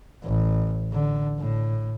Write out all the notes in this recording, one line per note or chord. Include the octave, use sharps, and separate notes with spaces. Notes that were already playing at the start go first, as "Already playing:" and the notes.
A1
D3
A2